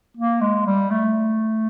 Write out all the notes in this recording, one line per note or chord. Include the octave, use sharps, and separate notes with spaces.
A#3
G#3
G3
A3